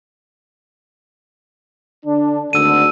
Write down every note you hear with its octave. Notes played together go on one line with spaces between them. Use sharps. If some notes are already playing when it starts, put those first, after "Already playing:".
D3 D4
G#1 D2 D3 E6 D#7